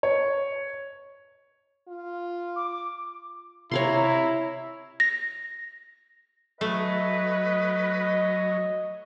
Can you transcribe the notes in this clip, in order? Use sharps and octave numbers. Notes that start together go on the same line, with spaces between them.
C#5
F4
D6
C3 E4 C#5 F5 A#5 C6
A#6
F#3 A3 B4 D#5